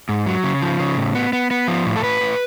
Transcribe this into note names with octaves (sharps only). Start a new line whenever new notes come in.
G#2
F#3
C#3
F3
C#3
A2
B3
B3
B3
F3
A2
A4
A2 B4
A2